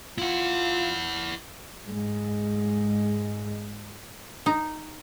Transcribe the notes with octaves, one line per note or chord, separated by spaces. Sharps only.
E4 F4 F#5
G#2 G#3
D#4